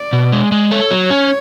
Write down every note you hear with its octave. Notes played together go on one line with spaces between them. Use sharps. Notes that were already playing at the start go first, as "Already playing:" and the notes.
Already playing: D5
B2
G#3
G#3
A4 C#5
F#3
C#4